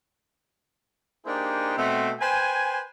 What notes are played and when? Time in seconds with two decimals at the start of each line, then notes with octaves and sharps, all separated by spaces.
1.25 A#3 D4 D#4 G4 G#4 C5
1.77 B2 A3 B3 C4
2.21 B4 C5 G5 G#5